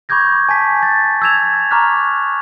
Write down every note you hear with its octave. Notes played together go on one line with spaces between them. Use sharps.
B5 C#6 D6 G6 G#6 A#6
G#5 A5 B6
A6 B6
E6 G6 G#6 E7 F7
A#5 C#6 D6 F6 F#6 B6